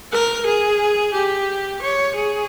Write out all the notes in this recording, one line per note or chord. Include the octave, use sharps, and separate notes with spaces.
A#4
G#4
G4
C#5
G#4